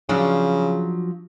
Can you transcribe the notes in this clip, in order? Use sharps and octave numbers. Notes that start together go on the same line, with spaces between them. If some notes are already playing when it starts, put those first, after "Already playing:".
C#3 F3 F#3 D4